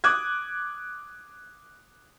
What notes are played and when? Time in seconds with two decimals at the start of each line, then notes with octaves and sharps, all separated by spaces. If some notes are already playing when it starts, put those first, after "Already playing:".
0.04 D6 D#6 F#6 G#6